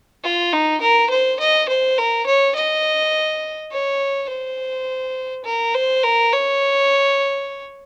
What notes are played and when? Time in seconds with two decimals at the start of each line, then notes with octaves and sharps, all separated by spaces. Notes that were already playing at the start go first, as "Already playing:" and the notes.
0.24 F4
0.53 D#4
0.81 A#4
1.10 C5
1.40 D#5
1.69 C5
1.98 A#4
2.26 C#5
2.55 D#5
3.72 C#5
4.30 C5
5.45 A#4
5.74 C5
6.03 A#4
6.32 C#5